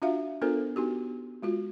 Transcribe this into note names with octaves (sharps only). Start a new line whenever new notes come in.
D4 F4 F#4 E5 F5
B3 D4 F4 A4 A#4 C5
B3 D#4 F#4 G4
G#3 F4 F#4